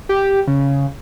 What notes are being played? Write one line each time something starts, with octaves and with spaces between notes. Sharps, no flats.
G4
C#3